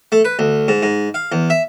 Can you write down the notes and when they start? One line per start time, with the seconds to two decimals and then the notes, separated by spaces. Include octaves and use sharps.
0.12 A3
0.25 B4
0.39 D2
0.68 G#2
0.83 G#2
1.14 F5
1.32 E2
1.50 E5